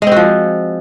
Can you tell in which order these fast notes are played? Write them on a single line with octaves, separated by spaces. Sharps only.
G#3 C4 F#4 F3